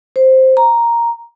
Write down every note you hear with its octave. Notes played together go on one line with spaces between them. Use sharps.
C5
A#5